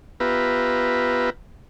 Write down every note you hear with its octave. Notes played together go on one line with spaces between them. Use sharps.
B3 F4 G4 B4 E5 A#5